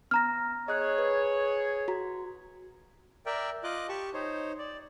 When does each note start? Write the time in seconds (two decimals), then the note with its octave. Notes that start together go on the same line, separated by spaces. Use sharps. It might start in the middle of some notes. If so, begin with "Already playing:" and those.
0.11 B3 A#5 F6 A#6
0.68 G#4 C#5 D#5 F#6
0.98 B4
1.88 F#4 A#5
3.26 A#4 D5 E5 G5
3.64 F4 D#5 D6 F#6
3.89 G4 A5 C#6
4.14 D#4 C5 C#5
4.58 D5